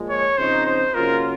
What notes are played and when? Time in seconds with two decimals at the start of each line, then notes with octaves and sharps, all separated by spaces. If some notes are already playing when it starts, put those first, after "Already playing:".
Already playing: A#2 F3 G#3
0.10 C#5
0.38 C#3 F3 C4 D#4 C5
0.66 C5
0.94 C#3 F#3 A#3 F4 A#4